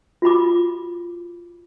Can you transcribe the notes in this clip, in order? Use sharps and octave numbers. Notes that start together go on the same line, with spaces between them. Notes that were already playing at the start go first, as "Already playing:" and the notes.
F4 F#4 B5 D6